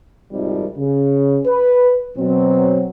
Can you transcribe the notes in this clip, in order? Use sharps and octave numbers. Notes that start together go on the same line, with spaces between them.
G#1 F2 C3 D#3 F3 G3
C#3
B4
B2 F#3 C4